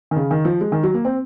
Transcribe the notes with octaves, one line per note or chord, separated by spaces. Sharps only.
D#3
C#3
D#3
F3
G#3
D#3
F#3
A#3
C4